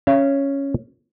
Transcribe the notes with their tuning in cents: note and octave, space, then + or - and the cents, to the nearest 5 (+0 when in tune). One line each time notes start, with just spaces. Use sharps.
C#4 +0 F5 -45